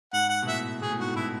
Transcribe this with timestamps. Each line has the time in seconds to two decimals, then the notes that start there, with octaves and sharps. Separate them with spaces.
0.13 G#2 F#5
0.30 F#5
0.42 B2
0.47 A2 E5
0.82 B2 G#4
0.90 A2
0.99 G#2 F#4
1.07 A2
1.16 B2 E4